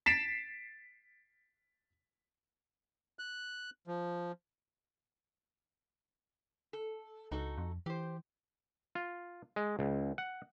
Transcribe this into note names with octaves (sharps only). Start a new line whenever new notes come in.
A6 B6 C7 D7 E7
F#6
F3
A4
C#2 D#4 F#4 A4
F2
E3 G4 C5
F4
G#3
C#2
F#5